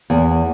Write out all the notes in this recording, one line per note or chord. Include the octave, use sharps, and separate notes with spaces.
E2